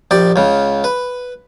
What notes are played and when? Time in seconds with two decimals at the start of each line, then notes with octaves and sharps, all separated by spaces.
0.11 A#1 G4 D5
0.36 C#2 C#3
0.84 B4